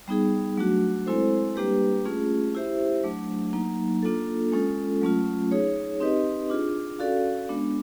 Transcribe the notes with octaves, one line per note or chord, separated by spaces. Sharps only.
G3 B3 D#4 G#4
F#3 A3 D4 F#4
G#3 C4 E4 A4 C5
G3 A#3 D4 G4 B4
A3 C#4 F4 G#4
E4 G4 C5 E5
F#3 A3 D4
F#3 A#3 D#4
A#3 D4 F4 A4
G#3 C#4 F4 A4
F#3 A3 C#4 F4
D#4 G#4 C#5
C4 D#4 G4 B4 D#5
D4 F4 G#4
C#4 F#4 A4 D5 F5
G#3 B3 D4